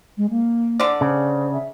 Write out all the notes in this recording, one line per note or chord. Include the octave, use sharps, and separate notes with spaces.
G#3
A#3
D3 D5
C#3 C5
E5